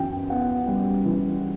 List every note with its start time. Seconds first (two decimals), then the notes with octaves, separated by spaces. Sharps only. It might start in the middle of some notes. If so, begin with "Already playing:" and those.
Already playing: F#2 E3 G5
0.29 B3 F#5
0.67 G3
1.05 E3